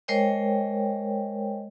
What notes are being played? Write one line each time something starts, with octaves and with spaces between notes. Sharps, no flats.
G#3 A#4 C5 C#5 D#5 G5